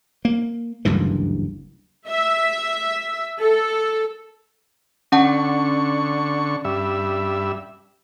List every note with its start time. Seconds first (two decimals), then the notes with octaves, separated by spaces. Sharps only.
0.25 A#3
0.85 F#1 D2 G2 E3
2.08 E5
3.40 A4
5.12 D3 C#4 F#5 A5 C#6
6.65 G2 E5